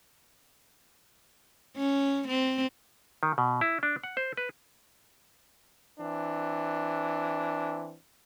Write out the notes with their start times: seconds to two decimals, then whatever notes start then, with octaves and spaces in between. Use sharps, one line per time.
1.76 C#4
2.28 C4
3.23 D#3
3.38 B2
3.61 E4
3.83 D4
4.03 F#5
4.17 C5
4.37 B4
5.98 E3 C4 D4